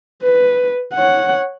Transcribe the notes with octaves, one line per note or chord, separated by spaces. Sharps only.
B4
C#5 F#5